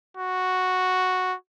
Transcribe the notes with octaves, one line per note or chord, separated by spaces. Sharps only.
F#4